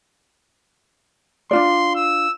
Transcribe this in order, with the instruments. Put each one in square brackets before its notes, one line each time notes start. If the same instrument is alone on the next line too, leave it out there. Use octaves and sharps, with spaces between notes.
[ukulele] D4 F4 D5 [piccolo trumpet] C6
[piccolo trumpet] E6